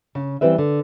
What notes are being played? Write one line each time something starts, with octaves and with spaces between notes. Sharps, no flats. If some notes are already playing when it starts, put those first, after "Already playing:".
C#3
E3 G3 C4 B4 E5
D3